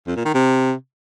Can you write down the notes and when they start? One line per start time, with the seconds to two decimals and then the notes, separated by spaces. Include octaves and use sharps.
0.07 F2
0.16 A#2
0.25 D#3
0.34 C3